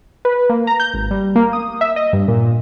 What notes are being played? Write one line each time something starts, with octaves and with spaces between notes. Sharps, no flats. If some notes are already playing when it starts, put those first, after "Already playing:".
B4
A#3
A#5
G6
G#1
G3
A#3
D#6
E5
D#5
G2
A#2